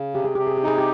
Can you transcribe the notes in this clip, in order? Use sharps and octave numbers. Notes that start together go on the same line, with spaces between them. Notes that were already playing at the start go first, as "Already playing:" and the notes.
Already playing: C#3
C3 G4
G#4
C3 G4
G#4
G4
D#4 G#4
G4